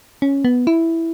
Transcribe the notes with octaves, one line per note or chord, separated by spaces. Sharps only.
C#4
B3
E4